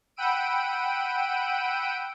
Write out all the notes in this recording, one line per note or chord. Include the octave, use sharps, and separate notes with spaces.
F#5 G5 B5 E6 D7 D#7